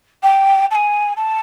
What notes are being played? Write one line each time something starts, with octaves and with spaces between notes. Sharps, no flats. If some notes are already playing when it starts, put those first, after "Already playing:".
G5
A5
G#5
A5